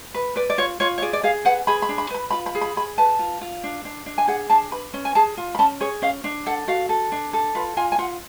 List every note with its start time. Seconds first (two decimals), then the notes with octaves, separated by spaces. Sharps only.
0.14 B4
0.36 B4 D5
0.50 D5
0.58 F4 C#5
0.80 F4 C#5
0.98 C#5
1.02 G#4 D5
1.13 D5
1.23 G#4 F5
1.45 B4 F#5
1.67 G#4 B5
1.82 B5
1.89 D4
1.98 B5
2.10 B4 B5
2.30 F4 B5
2.46 B5
2.55 G#4
2.61 B5
2.76 G#4 B5
2.98 B4 A5
3.19 F4
3.41 F4
3.64 D4
3.85 D4
4.06 D4
4.18 G#5
4.28 G#4 F#5
4.50 D4 A5
4.71 B4 B5
4.94 C#4
5.05 G#5
5.15 G#4 A5
5.37 F4
5.55 B5
5.59 C#4 A5
5.80 G#4 C#5
6.02 C#4 F5
6.24 D4
6.46 A4 F#5
6.68 F#4 F5
6.89 A4
7.12 D4
7.33 A4
7.55 F4 B4
7.77 F4 G#5
7.92 G#5
7.98 F4 F#5